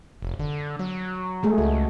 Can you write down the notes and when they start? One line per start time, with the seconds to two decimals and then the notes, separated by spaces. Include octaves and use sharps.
0.22 F1
0.40 D3
0.79 F#3
1.43 G#3 A3 G#4
1.58 C#2 F#4